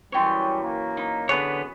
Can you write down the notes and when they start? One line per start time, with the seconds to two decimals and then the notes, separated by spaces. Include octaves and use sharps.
0.12 F#2 E3 G3 C#5 G5 C6 C#6
0.64 A#3
0.97 D#4 B5
1.29 D3 B3 G#4 B4 C#5 B5